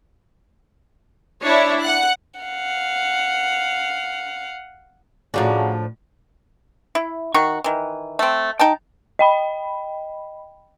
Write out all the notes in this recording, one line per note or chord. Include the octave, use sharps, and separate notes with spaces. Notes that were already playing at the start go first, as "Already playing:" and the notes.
D4 E4 C#5
F#5 F#6
F5 F#5
A2 C#3 F3 D4 F#4 F#5 A#5
E4
D#3 F#4 C#6
D#3 E3
A3 C4
D#4 G5 A5
D#5 G5 B5